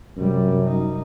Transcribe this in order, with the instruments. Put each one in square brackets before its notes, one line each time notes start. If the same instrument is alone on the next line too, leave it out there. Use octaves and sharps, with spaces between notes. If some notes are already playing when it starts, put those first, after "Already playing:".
[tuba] F#2 [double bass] C3 G3
[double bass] D#4